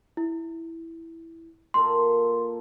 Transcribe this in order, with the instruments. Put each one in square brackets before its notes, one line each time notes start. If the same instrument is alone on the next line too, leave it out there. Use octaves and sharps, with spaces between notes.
[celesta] E4
[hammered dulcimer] A#2 A#3 A4 [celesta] C6